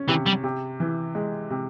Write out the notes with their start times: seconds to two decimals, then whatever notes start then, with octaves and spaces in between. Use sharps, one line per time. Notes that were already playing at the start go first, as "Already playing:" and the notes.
Already playing: C#4
0.09 C3 E3
0.26 G3
0.44 C3
0.80 E3
1.15 G#3
1.50 C3